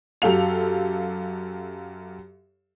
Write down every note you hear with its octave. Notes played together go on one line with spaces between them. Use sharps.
F#2 G4 A4 F5 F7